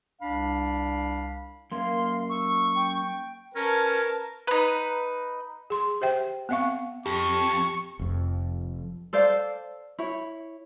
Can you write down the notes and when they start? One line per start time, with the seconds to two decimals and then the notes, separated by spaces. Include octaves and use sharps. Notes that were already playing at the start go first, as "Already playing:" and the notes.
0.22 C2 D4 F5 B5
1.72 F#2 A#3 F5 C6
2.29 C#6 E6
2.74 G5
3.56 C#4 A#4 B4 A5
4.47 D#4 B4
5.70 G#4 C6
6.01 G4 C5 E5 G5
6.49 B3 C4 E5 F5 C#6
7.06 F2 G4 C#6
7.99 F1 F2
9.13 A4 C5 D5 F5
9.99 E4 C#5